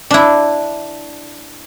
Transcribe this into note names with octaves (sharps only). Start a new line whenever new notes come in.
D4 E4